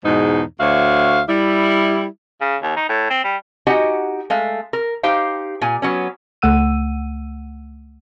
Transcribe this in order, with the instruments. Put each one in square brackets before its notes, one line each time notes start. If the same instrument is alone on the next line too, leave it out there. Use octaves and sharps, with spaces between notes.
[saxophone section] E2 G#2 B2 G#3 D#4
D2 F#4 C#5 E5 F5
G3 E4
[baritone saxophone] C#3
D#2
D#4
A2
C4
G3
[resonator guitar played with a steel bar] D#4 F#4 G4 D#5 F#5 G#5
G#3 A3 F5
A#4
D#4 G4 C5 F5 G5
A#2 G#5
F#3 B3 C#4
[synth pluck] C#2 A3 F#5 E6 D#7